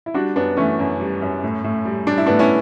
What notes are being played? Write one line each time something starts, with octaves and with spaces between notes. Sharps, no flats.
E4
G3 D4 F#4
F#2 B3 D4
E3 A3 C#4
F#2
G3
F#2
A2
A2
G3
G3 D4
E4
A2 B3 D4
C#4 E4